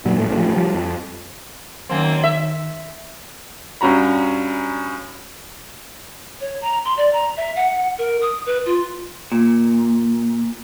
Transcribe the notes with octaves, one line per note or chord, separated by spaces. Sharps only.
F#2 A#2 F#3 G3
A#1 A2 A3
A1 F3 A3
F3 G3
F2
F#2 D#3 A#3 C4
E5
G2 C#4 F#4 A#5 B5
C#5
A#5
C6
D5
A#5
E5
F#5
A#4
D#6
B4
F4
A#2